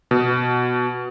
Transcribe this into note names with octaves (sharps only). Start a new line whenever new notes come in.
B2